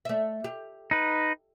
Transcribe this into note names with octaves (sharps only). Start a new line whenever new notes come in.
A3 E5
G4
D#4 B4